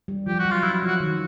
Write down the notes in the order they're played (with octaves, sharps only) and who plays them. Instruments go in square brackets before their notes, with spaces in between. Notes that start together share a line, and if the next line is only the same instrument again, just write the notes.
[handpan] G3
[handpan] F3 [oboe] G4
[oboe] F#4
[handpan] F#3
[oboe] F4
[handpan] F#3 [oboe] E4
[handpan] F3
[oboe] F#4
[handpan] D#3